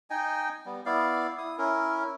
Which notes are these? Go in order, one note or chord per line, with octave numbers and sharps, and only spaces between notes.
D#4 D#5 G5 G#5
G3 B3
B3 E4 D5 F5
E4 D#6
C#4 E4 A#4